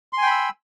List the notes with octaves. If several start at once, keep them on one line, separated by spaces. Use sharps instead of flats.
G5 G#5 B5 C6 E6